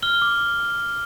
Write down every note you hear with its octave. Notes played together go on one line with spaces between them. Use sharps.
F6 G7
D6